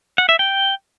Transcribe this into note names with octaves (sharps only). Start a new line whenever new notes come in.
F#5
E5
G5